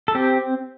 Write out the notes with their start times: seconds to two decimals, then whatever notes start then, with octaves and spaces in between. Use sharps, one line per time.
0.08 A4
0.15 C4 G4